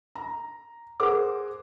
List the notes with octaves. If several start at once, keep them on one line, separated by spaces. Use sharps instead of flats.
A#5
G#4 A#4 C5 F#5 D6